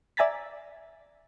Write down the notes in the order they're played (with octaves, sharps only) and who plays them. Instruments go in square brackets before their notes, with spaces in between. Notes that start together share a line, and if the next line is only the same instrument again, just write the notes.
[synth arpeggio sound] D5 E5 G#5 A#5 A6 B6